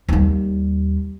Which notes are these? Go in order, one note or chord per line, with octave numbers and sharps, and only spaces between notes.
D#2 G3